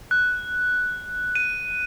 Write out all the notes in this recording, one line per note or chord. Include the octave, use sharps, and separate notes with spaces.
F#6
D#7